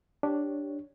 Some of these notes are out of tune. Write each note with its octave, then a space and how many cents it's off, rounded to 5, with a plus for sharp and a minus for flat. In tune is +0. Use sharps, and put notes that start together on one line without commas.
D4 +0 G4 +0 C#5 +0